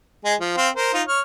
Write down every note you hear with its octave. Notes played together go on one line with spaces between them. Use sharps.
G#3 G#4
F3
C4 C5 F5
A#4 C5
D#4 F4
C#5 F6